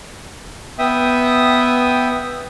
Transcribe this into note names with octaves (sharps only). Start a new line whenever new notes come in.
B3 E5 G5 D#6